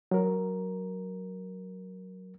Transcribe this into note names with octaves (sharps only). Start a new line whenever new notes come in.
F#3 A#4